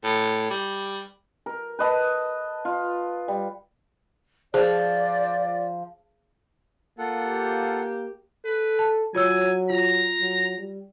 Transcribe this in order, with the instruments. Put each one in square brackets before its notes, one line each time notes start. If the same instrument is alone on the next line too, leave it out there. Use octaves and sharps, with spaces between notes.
[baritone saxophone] A2
G3
[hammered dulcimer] A#4
B4 D#5 A5
F4
G3
[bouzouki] F3 [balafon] G#4 C5 [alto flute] D5
[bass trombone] A#3 [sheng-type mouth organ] F4 A4 F#5
[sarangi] G4
[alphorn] A4 [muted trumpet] B4
[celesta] A5
[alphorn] F#3 [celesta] F4 C#5 E6 [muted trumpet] G#5
[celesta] F4 [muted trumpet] A#5
[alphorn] F#3
G3